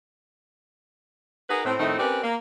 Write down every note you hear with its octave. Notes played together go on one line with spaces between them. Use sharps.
D#4 F#4 G#4 A#4 B4
A2 C4
F2 A2 D#3 A3 C4 D#4
C4 C#4 G4 A#4 B4 D5
A#3